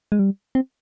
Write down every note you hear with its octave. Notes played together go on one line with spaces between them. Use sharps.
G#3
G3
C4